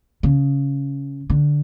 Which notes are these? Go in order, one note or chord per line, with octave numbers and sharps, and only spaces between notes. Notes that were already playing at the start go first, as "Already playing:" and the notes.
C#3
D3